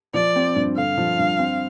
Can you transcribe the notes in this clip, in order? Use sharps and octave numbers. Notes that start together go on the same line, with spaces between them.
F3 D5
C4
G2
D3 F5
F3
G2
C4